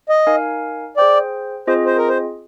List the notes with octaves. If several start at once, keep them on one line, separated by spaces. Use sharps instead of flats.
D#5
D#4 A#4 F5 G#5
G#4 C5 D5 G5
C4 F4 G#4 C5 D#5
C5
A#4
C5